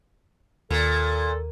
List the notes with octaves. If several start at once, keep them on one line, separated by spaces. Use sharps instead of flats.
D#2 A#2 A4